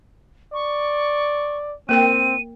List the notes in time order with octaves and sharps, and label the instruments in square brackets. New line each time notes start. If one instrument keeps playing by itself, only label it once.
[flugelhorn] D5 [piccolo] C#6
[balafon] A#3 A#4 G5 [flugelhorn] C4 [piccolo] D#7